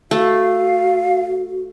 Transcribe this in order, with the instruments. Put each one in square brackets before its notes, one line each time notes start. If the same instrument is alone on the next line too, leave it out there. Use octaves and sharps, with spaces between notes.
[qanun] A3 [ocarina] F#4 [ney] F5